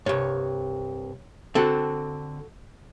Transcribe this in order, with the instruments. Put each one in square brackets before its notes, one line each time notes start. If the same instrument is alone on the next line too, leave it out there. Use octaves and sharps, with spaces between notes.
[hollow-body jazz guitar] C2 G2 [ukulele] C#5
[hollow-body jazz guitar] D3 C4 [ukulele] F#4 A4